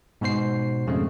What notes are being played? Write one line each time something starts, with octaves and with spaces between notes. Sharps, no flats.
G#2 B2 F#4 C5 C7
F2 C#3 G#3 A3